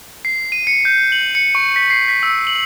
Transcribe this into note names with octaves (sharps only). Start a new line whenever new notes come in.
C7
D#7
C#7
G6
F#7
C#7
C#6
B6
C7
B6
E6
F#7